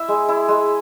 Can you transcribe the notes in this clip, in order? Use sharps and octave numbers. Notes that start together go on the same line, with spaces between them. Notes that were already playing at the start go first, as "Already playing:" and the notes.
Already playing: E4 E5
G#3
E4
G#3